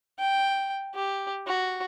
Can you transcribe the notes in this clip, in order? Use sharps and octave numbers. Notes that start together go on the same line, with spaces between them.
G5
G4
F#4